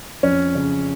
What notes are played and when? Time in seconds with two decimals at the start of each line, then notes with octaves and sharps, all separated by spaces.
0.23 F2 C#4
0.55 C#3